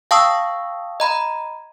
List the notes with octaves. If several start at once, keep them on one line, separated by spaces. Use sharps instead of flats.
F5 G5 A5 C#6 D#6 E6
D#5 A#5 B5